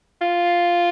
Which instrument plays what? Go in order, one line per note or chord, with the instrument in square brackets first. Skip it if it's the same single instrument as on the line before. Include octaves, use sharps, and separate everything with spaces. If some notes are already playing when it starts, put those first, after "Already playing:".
[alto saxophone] F4